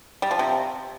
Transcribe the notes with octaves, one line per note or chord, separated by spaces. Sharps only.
G3
F3
C3